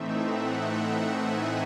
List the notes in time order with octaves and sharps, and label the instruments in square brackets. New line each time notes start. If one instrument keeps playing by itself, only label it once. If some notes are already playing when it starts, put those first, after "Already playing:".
Already playing: [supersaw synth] A2 E3 A3 C4 D#4 E5
F#5
E5
G#5